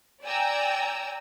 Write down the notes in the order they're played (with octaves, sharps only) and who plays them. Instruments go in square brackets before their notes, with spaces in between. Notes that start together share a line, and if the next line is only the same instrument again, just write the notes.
[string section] D5 G5 G#5 A#5 E6